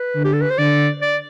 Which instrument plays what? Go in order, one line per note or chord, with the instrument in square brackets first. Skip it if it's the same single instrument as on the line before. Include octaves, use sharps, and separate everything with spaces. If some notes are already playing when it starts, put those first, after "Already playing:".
Already playing: [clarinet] B4
[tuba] D3
[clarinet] G4
A4
B4
C5
[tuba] D3 [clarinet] D5
[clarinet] D5